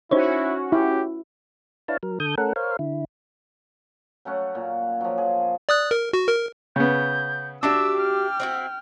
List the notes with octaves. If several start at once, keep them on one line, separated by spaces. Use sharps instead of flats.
C#4 D#4 E4 F#4 C5 C#5
E4 G4
D4 E4 B4 C#5 F5 A5
F#3 A#4
D3 A4 D#6 G6
A3 C#4 A4 A#4 F#5
A#4 C5 C#5 F5
D3 E4
F#3 A3 C#4 F#5
A#2
F3 F#3
G#4
D5 D#6 F#6
A#4
F#4
A#4
C#3 B3 G6
D4 F#4 G4 E5 D6 E6
G5 F6
C4 E4 F#4